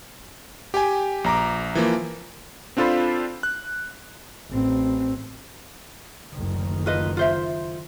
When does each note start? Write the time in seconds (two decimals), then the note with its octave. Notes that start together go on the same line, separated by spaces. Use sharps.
0.74 G4 G5 G#5
1.24 A#1 A#5 D6
1.75 E3 F3 A#3
2.77 C4 D4 F4 A4 C5 B5
3.43 F#6
4.50 A1 C4
6.32 F#1 D2 D#3
6.86 F4 B4 D#5
7.17 F4 C5 E5